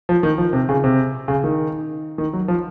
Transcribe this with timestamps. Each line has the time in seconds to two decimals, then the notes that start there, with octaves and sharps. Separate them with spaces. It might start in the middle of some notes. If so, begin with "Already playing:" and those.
0.09 F3
0.23 D#3
0.38 F3
0.53 C3
0.69 C#3
0.84 C3
1.28 C#3
1.44 D#3
2.18 D#3
2.33 F#3
2.48 F3